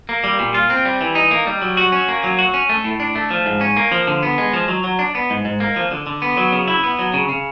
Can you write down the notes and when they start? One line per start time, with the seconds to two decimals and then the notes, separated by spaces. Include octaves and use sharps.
0.09 A#3
0.24 G3
0.39 A#2
0.54 F4
0.70 C4
0.85 G3
1.01 E3
1.15 D#4
1.31 A#3
1.47 G3
1.62 F#3
1.77 F#4
1.92 C#4
2.08 A#3
2.24 F#3
2.39 F#4
2.54 C#4
2.69 A3
2.84 A2
3.00 D4
3.15 A3
3.31 F3
3.46 G#2
3.61 C#4
3.77 A#3
3.92 F3
4.07 D3
4.23 B3
4.38 G#3
4.53 F3
4.68 F#3
4.84 F#3
4.99 D4
5.15 B3
5.30 G#2
5.45 G#2
5.60 A#3
5.76 F3
5.91 D3
6.07 D3
6.22 B3
6.37 F#3
6.52 C#3
6.68 E4
6.83 B3
6.99 F#3
7.14 C#3
7.29 C#3